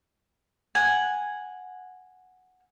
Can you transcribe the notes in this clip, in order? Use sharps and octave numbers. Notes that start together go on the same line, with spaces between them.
F#5 G#5